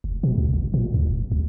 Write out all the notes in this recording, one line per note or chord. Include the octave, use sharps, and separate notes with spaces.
F1
B2
C#2
G#1
A#2
D2
E1
C#2